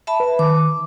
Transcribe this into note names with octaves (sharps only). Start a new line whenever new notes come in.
E5 A5 B5
B4
D#3 D6